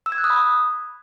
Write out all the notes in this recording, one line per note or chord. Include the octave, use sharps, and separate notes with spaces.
E6
G#6
F#6
D#6
B5